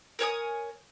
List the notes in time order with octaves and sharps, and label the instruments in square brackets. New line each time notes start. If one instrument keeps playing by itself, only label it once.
[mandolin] A#4 C#5 G#5 D#6